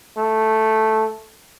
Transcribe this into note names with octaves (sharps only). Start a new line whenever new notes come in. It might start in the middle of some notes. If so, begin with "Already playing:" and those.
A3